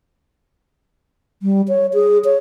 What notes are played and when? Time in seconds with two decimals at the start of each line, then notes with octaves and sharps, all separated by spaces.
1.43 G3
1.68 C#5
1.94 G#4
2.25 C#5